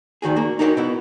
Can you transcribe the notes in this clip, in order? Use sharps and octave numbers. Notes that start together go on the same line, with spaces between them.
D2 D#3 F#4 G#4
A#3 F#4
D#4 F#4 G4 A#4 C5 C#5
B2 B3 E4